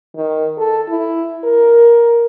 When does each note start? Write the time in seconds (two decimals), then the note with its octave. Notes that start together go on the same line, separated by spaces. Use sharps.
0.16 D#3
0.58 A4
0.89 E4
1.44 A#4